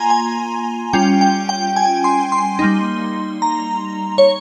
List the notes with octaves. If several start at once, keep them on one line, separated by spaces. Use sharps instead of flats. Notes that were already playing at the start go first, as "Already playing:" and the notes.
Already playing: A#3 F4 G#5 A#5 C6
G#5
G3 C#4 F4 G5
G5
G5
G#5
C6
C6
G3 A#3 D#4
A#5
C#5